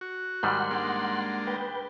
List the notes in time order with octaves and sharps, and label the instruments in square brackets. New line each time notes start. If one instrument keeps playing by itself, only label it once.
[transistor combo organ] F#4
[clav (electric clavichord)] G#2 D#3 G3 [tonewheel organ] F#5 C6
[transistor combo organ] G#3 A#3 D4
[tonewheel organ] B4 G5